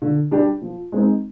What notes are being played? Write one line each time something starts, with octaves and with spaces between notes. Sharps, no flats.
D3
G3 D4 G4
F3
G#3 C4 D#4